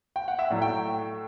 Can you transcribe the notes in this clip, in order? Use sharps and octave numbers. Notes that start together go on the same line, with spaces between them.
G5
F#5
E5
A2 F#3 A3 D5
G5